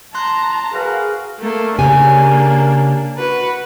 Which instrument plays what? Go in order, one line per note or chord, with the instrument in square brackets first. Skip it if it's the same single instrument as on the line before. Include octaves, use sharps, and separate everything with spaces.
[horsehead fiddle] A5 A#5 [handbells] C6 F#6
[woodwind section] F#4 A#4 B4 [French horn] G#4 [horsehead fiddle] F5
[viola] A3 A#3
[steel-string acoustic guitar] C#3 G4 G#5 [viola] A#3 D4
[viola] F#4 B4